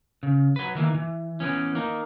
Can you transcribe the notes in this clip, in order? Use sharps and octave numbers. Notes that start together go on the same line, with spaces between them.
C#3
F#3 B4
D#3 E3 A#3
E3
E3 B3 C#4
A#3 D#4